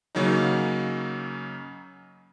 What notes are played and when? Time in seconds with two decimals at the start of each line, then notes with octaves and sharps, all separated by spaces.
0.15 C#3 F#3 A#3 C#4 D#4